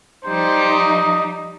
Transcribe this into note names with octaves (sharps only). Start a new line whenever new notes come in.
F3 G3 D#4 C5
D#5